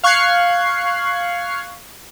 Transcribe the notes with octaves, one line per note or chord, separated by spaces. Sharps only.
F5 C#6 F6 F#6 G#6 C7